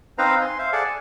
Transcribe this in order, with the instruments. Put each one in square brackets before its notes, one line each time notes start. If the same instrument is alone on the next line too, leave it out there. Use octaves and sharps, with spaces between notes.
[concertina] C4 D#4 B4 C5 F5 A#5
G#5 C6
C5 E5 F5
G#4 A4 D5 F#5 A5
G#5